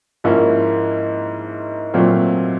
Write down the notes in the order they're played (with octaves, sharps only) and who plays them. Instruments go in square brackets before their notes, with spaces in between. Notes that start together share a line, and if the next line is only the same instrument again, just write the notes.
[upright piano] G#2 F3 A#3 C#4 E4
A#2 F#3 A3 C4 F4